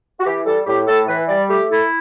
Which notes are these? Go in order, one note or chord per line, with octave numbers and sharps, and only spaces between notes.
F#4
E3 G4
G3 A4
A2 G4
A2 A4
E3 B4
G3 D5
A3 G4
E4 A4